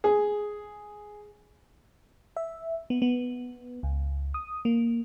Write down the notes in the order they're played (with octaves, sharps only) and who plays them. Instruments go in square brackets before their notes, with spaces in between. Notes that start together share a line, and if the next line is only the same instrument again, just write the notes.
[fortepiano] G#4
[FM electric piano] E5
B3
B3
C#2
D#6
A#3